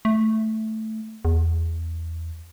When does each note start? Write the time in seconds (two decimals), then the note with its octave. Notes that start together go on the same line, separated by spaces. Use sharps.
0.05 A3
1.25 E2